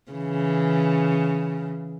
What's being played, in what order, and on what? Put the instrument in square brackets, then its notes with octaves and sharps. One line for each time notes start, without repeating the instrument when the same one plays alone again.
[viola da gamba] C#3 E3